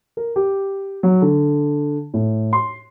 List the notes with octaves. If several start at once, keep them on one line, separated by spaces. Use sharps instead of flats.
A#4
G4
F#3
D3
A2
C6